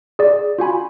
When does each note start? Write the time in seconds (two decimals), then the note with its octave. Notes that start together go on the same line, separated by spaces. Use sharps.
0.19 G#4 D5
0.58 F4 F#4 G#5 B5